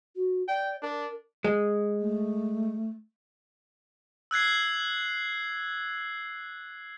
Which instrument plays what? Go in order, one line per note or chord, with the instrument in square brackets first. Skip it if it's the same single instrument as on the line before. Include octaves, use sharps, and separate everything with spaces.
[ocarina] F#4
[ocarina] D5 [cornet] G5
[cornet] D4 [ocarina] A#4
[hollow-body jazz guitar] G#3
[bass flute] A3
[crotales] E6 F#6 G#6 C7